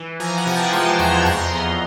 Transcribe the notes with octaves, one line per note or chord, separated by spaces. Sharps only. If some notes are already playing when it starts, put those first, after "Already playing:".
Already playing: E3
F3 G#5 A#5
F#5 G#5
C3 A#5
G5 A5
G#3 A#5 C6
E2 B5 C#6
F2 A#5 C6
B3